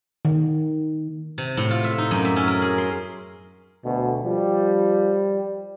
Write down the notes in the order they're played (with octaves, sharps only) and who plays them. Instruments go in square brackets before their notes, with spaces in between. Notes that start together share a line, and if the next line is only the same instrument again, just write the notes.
[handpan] D#3
[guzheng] C3
A2
F4
E5
D#4
F#2
E5
C#4
A#4
G#4
C6
[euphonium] D2 [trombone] B2
[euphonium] F3 [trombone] G3